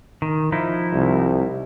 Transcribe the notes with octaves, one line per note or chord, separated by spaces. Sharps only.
D#3
F3 D#4 E4
C2